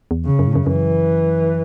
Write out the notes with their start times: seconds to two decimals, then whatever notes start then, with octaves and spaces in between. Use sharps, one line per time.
0.11 E2
0.25 C#3
0.39 F#2
0.47 A2
0.56 F#2
0.67 F#2 E3